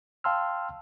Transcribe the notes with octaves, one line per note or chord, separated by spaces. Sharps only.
F5 G5 A5 C6 E6 F6